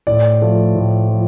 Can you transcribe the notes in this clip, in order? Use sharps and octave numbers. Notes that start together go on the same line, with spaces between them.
A2 D5
F3 A3
A2
F3